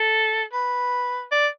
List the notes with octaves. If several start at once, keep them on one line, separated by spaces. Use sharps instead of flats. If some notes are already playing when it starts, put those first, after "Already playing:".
Already playing: A4
B4
D5